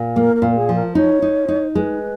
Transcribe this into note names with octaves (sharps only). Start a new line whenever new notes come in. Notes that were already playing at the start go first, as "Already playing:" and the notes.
Already playing: A#2
A#3 A#4
A#4
A#2
G#4
F3
A#4
D#4 C#5
D#4
D#4
G#3 B4